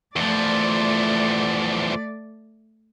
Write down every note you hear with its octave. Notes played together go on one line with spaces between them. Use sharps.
E2 F3 A3 D5